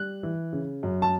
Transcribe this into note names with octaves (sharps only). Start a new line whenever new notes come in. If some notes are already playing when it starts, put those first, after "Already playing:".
Already playing: G3 F#6
E3
C#3
F#2
A5